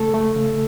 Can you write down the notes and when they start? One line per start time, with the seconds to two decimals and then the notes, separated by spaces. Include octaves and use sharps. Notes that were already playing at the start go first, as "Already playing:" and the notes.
Already playing: C#3 A3 A4
0.14 A3
0.36 C#3